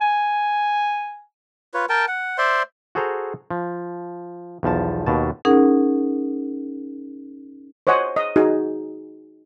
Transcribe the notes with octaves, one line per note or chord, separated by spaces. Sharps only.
G#5
F4 B4 C#5
A#4 G5 A5
F#5
C5 D5 E5 C6
F#4 G#4 A4 C5 A#5
F3
B1 E2 F3 A5
D#2 B2 A5
C#4 D#4 G#4 A#4 F#5
C5 C#5 D#5 F#5 G#5
D#5
D#4 F#4 G#4